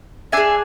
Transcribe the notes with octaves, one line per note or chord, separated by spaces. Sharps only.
D4 G#4 E5 G#5